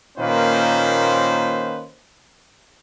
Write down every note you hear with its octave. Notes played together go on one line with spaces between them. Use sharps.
A#2 D#3 A#3 C#4 B4 C5